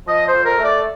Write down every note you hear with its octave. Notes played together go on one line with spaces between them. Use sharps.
F3 D#5
C5
F2
A#4
A3
D5